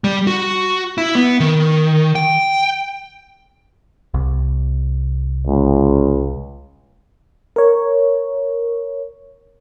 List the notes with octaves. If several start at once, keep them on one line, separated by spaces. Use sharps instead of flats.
G3
F#4
E4
B3
D#3
G5
C2
C#2
A#4 C#5